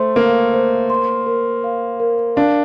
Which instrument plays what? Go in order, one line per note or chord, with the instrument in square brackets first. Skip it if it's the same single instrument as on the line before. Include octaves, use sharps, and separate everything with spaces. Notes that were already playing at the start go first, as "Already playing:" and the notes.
Already playing: [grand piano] A3 [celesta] C5 C6
[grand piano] A#3 [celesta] F5
[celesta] C5
C6
A#4
F5
A#4
[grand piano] D4 [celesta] F5